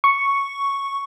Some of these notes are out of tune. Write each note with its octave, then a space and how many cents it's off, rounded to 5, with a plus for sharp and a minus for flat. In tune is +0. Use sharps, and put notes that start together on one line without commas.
C#6 +0